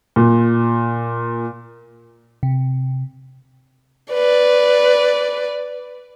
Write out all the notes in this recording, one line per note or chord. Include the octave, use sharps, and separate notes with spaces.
A#2
C3
B4 D5